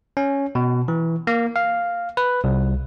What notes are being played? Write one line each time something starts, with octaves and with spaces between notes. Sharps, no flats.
C#4
B2
E3
A#3
F5
B4
C2